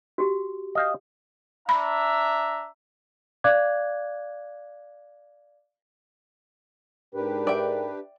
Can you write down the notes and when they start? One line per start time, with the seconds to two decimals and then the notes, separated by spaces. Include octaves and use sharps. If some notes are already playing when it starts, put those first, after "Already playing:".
0.18 F#4 G4
0.75 D#5 F5 G5
1.69 D4 E5 A#5 B5
3.44 D5 F5 D6 F#6 G#6
7.15 G#2 D4 G4 A#4 B4
7.47 D5 E5 G5